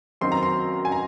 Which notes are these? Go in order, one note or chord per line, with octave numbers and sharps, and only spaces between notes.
F#2 D#3 F#3 C4 C6
A#5
C6
G#5
A#5